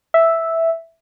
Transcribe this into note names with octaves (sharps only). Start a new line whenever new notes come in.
E5